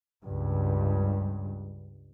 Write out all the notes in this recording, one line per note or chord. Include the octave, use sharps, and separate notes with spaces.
C#2 G2